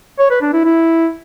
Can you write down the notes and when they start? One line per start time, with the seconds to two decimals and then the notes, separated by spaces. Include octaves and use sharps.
0.19 C#5
0.30 B4
0.42 D4
0.53 E4
0.64 E4